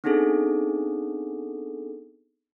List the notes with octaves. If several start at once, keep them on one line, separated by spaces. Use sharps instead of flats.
B3 C4 D4 D#4 G#4 A4